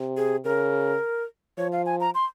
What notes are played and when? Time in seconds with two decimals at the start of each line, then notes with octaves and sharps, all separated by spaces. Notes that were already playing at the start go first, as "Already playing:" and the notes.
Already playing: C3
0.17 G#4
0.44 C#3 A#4
1.58 F3 C#5
1.72 F5
1.86 G#5
2.00 A#5
2.15 C6